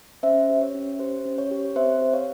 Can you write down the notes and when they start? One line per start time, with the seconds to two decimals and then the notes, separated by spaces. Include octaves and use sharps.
0.23 C#4 C5 E5
0.49 G4
0.62 C#5
0.74 C#4
0.99 G4 C5
1.25 C#4
1.38 C#5
1.51 G4
1.76 C4 C5 E5
2.02 G4
2.13 C#5 F5